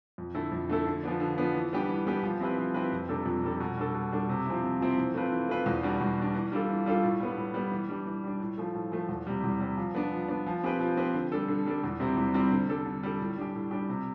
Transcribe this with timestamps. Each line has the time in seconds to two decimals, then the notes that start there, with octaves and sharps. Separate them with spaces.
0.18 F2
0.35 D3 A3 E4 A4
0.52 F2
0.69 D3 A3 E4 A4
0.87 D3
1.03 F3 B3 D4
1.20 D3
1.37 F3 B3 D4
1.55 E3
1.73 G3 B3 D4 G4
1.89 E3
2.07 G3 B3 D4 G4
2.23 F3
2.40 C4 E4 G4 B4
2.58 F3
2.74 C4 E4 G4 B4
2.93 F2
3.09 C3 G3 D4 A4
3.26 F2
3.43 C3 G3 D4 A4
3.60 B2
3.77 G3 D4 A4
3.94 B2
4.12 G3 D4 A4
4.29 C3
4.46 F3 C4 E4
4.64 C3
4.81 F3 C4 E4
4.98 E3
5.14 A3 C4 F4 B4
5.32 E3
5.49 A3 C4 F4 B4
5.66 E2
5.83 B2 G3 D4
6.01 E2
6.18 B2 G3 D4
6.34 E3
6.52 G3 D4 F4 A4
6.69 E3
6.86 G3 D4 F4 A4
7.03 A2
7.20 G3 B3
7.37 A2
7.54 G3 B3
7.72 E3
7.89 G3 D4
8.07 E3
8.24 G3 D4
8.40 A2
8.58 F3 A3
8.74 A2
8.92 F3 A3
9.09 E2
9.27 C3 G3
9.44 E2
9.60 C3 G3
9.77 F3
9.95 B3 D4
10.12 F3
10.28 B3 D4
10.47 F3
10.63 C4 G4 B4
10.80 F3
10.97 C4 G4 B4
11.14 D3
11.32 G3 D4 A4
11.48 D3
11.66 G3 D4 A4
11.84 E2
12.00 C3 G3 C4 E4
12.17 E2
12.34 C3 G3 C4 E4
12.52 D3
12.69 G3 D4 A4
12.86 D3
13.03 G3 D4 A4
13.21 A2
13.38 G3 D4 G4
13.55 A2
13.71 G3 D4 G4
13.89 C3